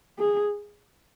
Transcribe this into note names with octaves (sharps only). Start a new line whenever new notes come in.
G#4